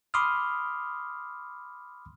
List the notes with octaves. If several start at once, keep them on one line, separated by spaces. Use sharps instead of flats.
B5 C6 D6 D#6 F6